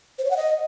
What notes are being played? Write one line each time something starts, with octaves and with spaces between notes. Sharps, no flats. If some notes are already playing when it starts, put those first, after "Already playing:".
C5
C#5
F#5
D#5